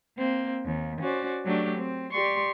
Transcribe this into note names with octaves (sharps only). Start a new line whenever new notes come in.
A#3 C4
D#2
C#4 F#4 C5 D5
F#3 A3 D4 G4
C4
G4 D5 C6 C#6